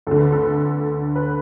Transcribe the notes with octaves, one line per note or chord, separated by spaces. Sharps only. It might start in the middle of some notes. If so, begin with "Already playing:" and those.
D2 D3 A4
B4
A4
B4